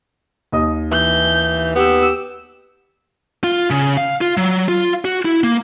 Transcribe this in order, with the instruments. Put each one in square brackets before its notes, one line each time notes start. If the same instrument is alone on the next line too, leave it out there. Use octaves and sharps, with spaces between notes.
[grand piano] D#2 D#5 D#6
[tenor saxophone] E3 [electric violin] G6
[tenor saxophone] B3 [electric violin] G4 E6
[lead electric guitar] F4
C#3
F5
F4
F#3
F4
F#4
E4
A#3